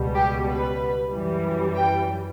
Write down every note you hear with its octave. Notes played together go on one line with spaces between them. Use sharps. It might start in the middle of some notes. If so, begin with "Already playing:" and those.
Already playing: C#2 B2 G3
G4
B4
F#2 E3 G3
G5